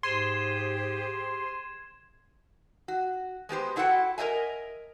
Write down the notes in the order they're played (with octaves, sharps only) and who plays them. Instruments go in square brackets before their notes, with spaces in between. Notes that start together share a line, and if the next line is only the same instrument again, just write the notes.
[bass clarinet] G#2 [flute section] G4 G#4 C5 [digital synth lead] C6 [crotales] G#6 D#7 E7
[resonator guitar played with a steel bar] F#4
G#3 B3 G4 C5
D4 E4 F#4 A4 F#5 G5
A#4 C5 D#5 E5 G#5